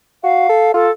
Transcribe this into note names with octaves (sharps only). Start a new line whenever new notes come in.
F#4 F5
A4
F4 A4